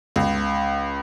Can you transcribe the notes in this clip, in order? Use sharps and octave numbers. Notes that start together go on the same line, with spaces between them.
C#2